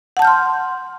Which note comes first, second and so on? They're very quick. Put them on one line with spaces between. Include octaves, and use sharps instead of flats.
F#5 A5 G6 F6 C6